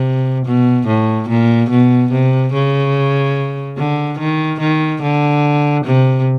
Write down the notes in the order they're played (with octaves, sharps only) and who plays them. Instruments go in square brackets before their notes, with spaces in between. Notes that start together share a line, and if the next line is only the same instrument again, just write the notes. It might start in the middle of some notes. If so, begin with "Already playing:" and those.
Already playing: [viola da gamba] C3
B2
A2
A#2
B2
C3
C#3
D3
D#3
D#3
D3
C3